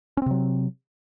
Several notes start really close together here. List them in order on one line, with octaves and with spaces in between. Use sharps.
C#4 C4 C3 F#3